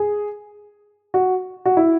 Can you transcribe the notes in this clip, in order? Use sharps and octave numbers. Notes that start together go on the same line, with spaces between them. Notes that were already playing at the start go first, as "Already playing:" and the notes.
Already playing: G#4
F#4
F#4
E4